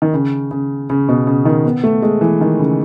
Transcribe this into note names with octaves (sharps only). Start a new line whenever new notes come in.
D#3
C#3
C#3
C#3
B2
C#3
D#3
B3
A3
G#3
E3
D#3
C#3